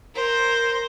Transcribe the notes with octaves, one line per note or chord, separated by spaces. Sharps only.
A#4 C5